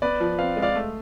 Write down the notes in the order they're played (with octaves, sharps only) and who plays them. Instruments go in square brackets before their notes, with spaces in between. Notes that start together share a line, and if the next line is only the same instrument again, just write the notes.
[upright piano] B3 [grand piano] B4 D5
[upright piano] F3
[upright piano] C4 [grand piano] F5
[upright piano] G#3
[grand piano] D5 F5
[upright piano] A3